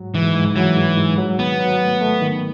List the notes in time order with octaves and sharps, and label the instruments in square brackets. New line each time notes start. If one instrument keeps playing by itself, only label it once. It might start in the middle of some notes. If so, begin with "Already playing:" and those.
Already playing: [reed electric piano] G#2 F#3
[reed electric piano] G#2 [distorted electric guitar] E3
[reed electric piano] G#2
[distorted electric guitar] E3 [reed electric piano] F#3
[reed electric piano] G#2
G#2
F#3
[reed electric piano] D#3 [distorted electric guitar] B3
[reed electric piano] F#3
A3
A3
D#3